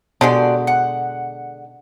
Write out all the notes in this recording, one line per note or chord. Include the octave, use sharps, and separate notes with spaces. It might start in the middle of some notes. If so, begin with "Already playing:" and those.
B2 D3 G#3 F#4 G4 D5
F#5